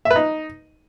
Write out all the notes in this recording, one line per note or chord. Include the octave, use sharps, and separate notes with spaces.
E5
B4
D#4